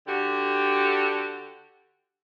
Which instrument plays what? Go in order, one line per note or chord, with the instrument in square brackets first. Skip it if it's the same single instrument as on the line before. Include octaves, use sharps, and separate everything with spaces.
[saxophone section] D3 F#4 G4